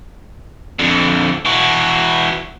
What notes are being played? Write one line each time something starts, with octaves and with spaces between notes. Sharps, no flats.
F2 D3
E3 F#4